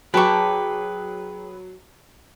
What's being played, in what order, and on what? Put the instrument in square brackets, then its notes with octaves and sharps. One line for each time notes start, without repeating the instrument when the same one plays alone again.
[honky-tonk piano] F#3 [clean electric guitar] G#4 G5 [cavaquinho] B4 C#6 [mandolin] A5 A#5 D6